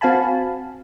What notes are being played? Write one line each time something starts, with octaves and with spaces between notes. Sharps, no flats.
C4 F#4 F5 G#5 A5 B5